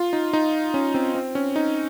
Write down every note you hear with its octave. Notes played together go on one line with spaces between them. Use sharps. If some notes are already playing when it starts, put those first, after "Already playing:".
Already playing: F4
D#4
D#4
C#4
C4
C4
C#4
D#4